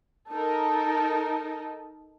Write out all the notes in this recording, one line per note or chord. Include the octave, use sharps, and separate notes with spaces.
D#4 A4 A#4